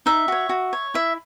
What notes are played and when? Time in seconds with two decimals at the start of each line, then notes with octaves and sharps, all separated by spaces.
0.06 D#4 E5
0.28 F#4 C#5
0.49 F#4
0.73 C#5
0.94 E4 E5